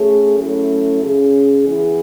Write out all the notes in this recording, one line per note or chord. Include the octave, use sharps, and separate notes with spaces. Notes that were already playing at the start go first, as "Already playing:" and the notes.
Already playing: A3 C#4 G#4
F#3 A3 C#4 E4 A4
C#3 G#3 C#4 G#4
E3 B3 E4 G#4